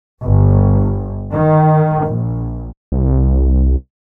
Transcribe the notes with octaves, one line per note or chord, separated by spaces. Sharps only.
G1
D#3
A#1
C2